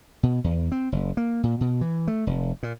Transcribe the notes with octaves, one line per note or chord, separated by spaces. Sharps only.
B2
E2
C4
F#1
A#3
A#2
B2
E3
A3
F1
A#2